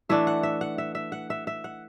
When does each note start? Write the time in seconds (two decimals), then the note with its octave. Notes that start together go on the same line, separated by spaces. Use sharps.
0.09 E3 A3 D4 E5
0.27 F#5
0.43 E5
0.61 F#5
0.78 E5
0.95 E5
1.12 F#5
1.30 E5
1.47 E5
1.64 F#5